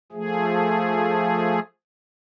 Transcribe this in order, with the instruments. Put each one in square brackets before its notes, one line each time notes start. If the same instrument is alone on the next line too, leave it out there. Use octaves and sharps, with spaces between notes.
[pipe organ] F3 A3 G#4